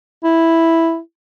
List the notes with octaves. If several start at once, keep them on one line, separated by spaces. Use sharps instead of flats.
E4